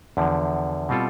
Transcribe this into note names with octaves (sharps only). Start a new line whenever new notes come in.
E2 D3 F3
B2 G3 C4 F4 A4